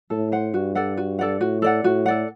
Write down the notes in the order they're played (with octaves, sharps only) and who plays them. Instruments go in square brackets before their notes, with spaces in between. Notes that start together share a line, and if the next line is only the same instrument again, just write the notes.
[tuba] A2 [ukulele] A4
[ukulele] C5 F#5
[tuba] G2 [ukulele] F#4
[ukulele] A4 D5 F#5
F#4
A4 D5 F#5
[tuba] A2 [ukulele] F#4
[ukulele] A4 D5 F#5
[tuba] A2 [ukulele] F#4
[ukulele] A4 D5 F#5